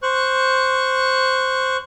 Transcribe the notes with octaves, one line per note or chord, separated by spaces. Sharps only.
C5 C#6 F#6